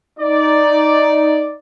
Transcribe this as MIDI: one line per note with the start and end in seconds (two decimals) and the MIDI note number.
0.19 1.55 63
0.19 1.55 74